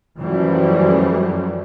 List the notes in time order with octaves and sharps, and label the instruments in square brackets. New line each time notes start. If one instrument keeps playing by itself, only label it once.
[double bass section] F#2 E3 F3 G3 A3